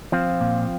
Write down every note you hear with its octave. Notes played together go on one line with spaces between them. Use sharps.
F3 C4 F4
A#2